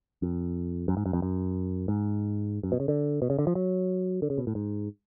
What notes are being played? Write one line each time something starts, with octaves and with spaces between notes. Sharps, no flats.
F2
F#2
G#2
F#2
F2
F#2
G#2
F#2
B2
C#3
D3
B2
C#3
D3
F3
F#3
D3
C#3
B2
A2
G#2